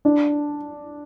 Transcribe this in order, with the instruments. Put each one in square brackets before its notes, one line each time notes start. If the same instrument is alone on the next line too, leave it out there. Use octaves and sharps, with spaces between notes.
[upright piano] D4